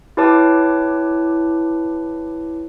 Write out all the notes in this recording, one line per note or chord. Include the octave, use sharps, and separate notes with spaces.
E4 G4 B4 C#5 A5 D6